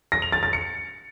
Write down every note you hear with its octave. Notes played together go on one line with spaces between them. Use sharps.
A#6
F7
A6
A6
C#7